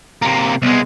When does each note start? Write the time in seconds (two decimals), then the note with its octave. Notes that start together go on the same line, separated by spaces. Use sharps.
0.22 C3 A#3
0.62 C2 G#3 B3